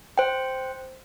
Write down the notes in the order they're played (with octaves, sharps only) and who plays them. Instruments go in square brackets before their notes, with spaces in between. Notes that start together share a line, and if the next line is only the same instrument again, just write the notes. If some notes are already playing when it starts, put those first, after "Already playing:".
[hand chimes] C5 G5